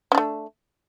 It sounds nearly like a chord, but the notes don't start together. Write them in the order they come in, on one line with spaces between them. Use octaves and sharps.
C#4 D4 A3